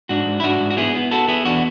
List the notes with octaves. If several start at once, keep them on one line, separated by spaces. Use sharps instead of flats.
G#2 D4 F#4
G#2
E4
G#2 D4 F#4
G#2
F#4
B3 E4 G#4
B3
B3 F#4 A4
B3 E4 G#4
E2 D4 F#4